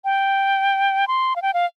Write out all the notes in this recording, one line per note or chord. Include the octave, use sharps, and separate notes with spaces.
G5
C6
F5
G5
F5